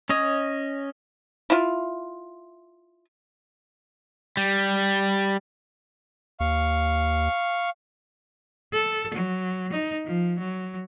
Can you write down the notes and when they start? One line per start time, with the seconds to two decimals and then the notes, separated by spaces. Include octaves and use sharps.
0.09 C#4 C#5 D#5
1.50 E4 F4
4.37 G3
6.40 D#2 F5 C#6
8.73 A4
9.14 F#3
9.72 D#4
10.05 F3
10.39 F#3